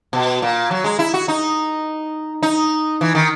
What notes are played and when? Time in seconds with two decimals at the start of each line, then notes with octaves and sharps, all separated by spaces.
0.13 B2
0.42 A#2
0.71 F#3
0.84 G#3
0.99 E4
1.14 F#4
1.28 D#4
2.43 D#4
3.01 E3
3.15 D#3